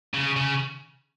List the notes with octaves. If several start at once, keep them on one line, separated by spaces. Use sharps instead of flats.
C#3
C#3